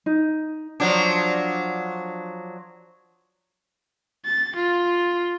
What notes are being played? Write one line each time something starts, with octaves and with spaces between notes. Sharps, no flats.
D#4
F3 F#3 D4
A6
F4